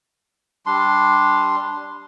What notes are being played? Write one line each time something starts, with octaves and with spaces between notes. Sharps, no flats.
G3 D4 C6